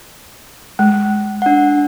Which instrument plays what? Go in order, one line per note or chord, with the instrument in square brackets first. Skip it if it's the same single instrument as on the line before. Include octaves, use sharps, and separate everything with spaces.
[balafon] G#3
[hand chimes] D4 F#5